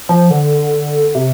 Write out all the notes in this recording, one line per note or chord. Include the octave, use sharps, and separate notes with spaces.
F3
D3
C3